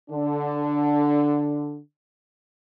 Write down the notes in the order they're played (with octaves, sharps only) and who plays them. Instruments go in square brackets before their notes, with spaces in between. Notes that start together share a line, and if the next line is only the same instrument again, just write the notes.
[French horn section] D3 D4